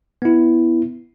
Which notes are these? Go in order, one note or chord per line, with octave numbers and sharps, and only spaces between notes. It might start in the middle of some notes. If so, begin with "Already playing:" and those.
B3 E4